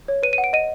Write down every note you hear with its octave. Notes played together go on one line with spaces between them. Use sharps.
C#5
B4 D#7
D#7
F#5
D7
D#5 D#7